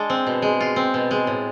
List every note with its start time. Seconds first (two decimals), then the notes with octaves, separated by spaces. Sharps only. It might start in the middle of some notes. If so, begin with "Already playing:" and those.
Already playing: G#3 D4 A4
0.10 C4
0.27 B2
0.42 G#3
0.60 F4
0.76 C4
0.94 B2
1.11 G#3
1.27 A2